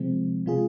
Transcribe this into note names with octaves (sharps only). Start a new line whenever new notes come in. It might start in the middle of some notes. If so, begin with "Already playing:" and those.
Already playing: C3 F3 G#3 C4
C3 G#3 F4 G#4